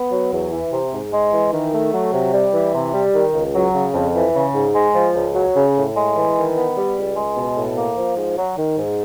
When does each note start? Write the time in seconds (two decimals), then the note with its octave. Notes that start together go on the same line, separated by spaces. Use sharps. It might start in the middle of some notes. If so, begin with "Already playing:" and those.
Already playing: B3
0.12 F#3
0.32 E2
0.52 E3
0.72 C3
0.93 G#2
1.13 G#3
1.33 E3
1.52 D#3
1.73 A3
1.94 F#3
2.12 C3
2.34 G3
2.53 E3
2.74 C3
2.94 G3
3.14 D#3
3.34 C#2
3.54 F#3
3.74 C#3
3.94 F2
4.14 E3
4.35 C#3
4.55 G#2
4.75 G#3
4.95 F3
5.15 C#2
5.35 F#3
5.56 C#3
5.76 A2
5.96 G#3
6.16 E3
6.36 D#3
6.56 B3
6.76 G3
6.97 C#2
7.17 G#3
7.37 B2
7.57 A2
7.77 A#3
7.97 F3
8.17 G#2
8.38 F#3
8.58 D#3
8.78 G#2